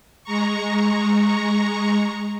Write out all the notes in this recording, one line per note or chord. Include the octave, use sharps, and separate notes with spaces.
G#3 A#5 C#6